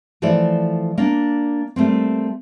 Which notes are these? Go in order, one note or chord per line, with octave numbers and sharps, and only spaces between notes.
E3 F3 A3 A4 C5 D5
A#3 D4
G3 A3 A#3 C4